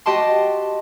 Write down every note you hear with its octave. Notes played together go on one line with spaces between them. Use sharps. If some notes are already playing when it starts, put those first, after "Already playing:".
F#4 G4 D#5 A5 C6